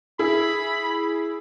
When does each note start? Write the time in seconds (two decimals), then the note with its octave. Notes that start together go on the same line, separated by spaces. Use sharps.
0.19 E4 G#4 B5